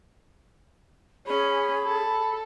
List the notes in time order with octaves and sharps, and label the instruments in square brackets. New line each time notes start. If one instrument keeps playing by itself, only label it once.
[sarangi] C#4 [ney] G#4 [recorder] B5
[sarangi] A4